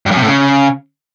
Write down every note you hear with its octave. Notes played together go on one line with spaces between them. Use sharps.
G2
F#2
C3
A2
C#3